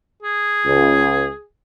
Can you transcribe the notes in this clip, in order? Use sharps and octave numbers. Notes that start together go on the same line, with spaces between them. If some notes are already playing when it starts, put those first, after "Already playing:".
G#4
C#2